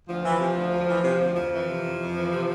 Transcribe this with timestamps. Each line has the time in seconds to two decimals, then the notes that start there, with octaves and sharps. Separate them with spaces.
0.07 D2 F3
0.24 E3
0.40 C3
0.56 D2
0.72 D2
0.88 E3
1.04 C3
1.20 D2
1.35 F2 F3
1.52 E3
1.68 C3
1.84 F2
1.99 F2
2.16 E3
2.32 C3